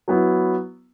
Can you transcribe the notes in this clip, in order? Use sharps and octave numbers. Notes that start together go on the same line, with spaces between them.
F#3 B3 E4